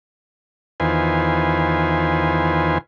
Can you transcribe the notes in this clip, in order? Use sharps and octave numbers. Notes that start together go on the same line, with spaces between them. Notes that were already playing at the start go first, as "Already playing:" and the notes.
E2 D#3 F4 B4 C5 G#5